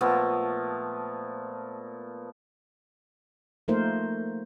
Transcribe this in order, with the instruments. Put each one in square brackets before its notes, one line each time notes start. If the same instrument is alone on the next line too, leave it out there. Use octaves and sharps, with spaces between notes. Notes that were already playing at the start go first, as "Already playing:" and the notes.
[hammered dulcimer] A#2 F3 A3 B3
[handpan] F3 A3 A#3 D#4 A#4 C5